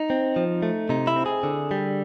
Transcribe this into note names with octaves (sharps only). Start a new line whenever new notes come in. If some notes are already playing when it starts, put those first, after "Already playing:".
Already playing: D#4
C4
F3
A3
C3 D#4
E4
C4
G#4
D3
G3